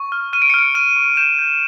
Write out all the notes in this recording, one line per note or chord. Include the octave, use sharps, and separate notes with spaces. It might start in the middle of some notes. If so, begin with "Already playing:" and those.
Already playing: C#6
F6
F6 D#7
D7
C#7
F6 D7
F6 D#7
C#6
G6 E7
G6